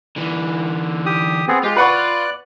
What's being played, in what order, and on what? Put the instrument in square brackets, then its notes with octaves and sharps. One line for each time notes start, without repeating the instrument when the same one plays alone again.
[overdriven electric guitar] D3 E3
[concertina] G4 D#6
B3 C4 G#4
[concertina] G#3 G4 [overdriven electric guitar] F4
[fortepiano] B4 F#5 C#6 [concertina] D5 F#6